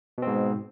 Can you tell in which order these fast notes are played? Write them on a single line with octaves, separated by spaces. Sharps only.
B2 C4 G#2